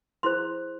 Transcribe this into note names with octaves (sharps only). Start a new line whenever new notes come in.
E4 G#4 C5 C6